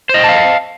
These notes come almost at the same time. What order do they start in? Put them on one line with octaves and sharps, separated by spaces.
C5 D#5 G5 A5 F5